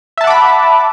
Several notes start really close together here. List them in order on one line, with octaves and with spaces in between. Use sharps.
E5 A5 F#5 D6 B5